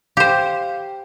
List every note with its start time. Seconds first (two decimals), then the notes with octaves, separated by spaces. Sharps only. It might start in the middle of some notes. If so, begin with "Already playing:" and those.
0.17 G4 C5 F5 G5